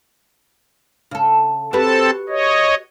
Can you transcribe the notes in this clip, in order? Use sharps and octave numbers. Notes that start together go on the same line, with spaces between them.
C#3 A4
C4 F#4 G4 A4 B4 A5
C#5 D#5